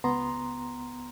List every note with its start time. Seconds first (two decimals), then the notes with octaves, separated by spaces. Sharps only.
0.04 C#2 B3 A#5 C6